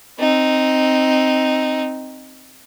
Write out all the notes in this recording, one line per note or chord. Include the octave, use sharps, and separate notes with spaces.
C4 D#4